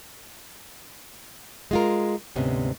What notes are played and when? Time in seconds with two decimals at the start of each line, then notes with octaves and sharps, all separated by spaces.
1.71 G#3 F4 A#4
2.36 D2 G#2 C3 B3 C#4